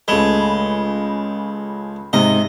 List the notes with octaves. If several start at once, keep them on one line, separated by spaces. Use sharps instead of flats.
C#2 G#3 A3 B5
G#2 C3 D#5